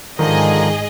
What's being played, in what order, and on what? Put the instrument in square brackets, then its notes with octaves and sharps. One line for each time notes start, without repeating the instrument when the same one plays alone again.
[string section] G#2 G#4 D#5 [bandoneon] D3 F3 D#4 [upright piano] D#3